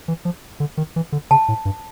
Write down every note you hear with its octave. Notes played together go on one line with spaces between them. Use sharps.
E3
F3
D3
D#3
E3
D3
C#3 A5
A2
G2